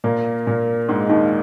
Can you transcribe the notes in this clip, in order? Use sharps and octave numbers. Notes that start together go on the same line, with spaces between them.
A#2 A#3
A#2 A#3
G#2 G#3
D#2 D#3